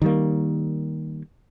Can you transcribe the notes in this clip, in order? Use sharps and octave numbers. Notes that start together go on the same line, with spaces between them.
D#3 G3 A#3